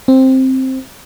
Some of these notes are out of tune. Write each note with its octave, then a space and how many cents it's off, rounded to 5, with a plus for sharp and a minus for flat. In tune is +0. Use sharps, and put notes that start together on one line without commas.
C4 +5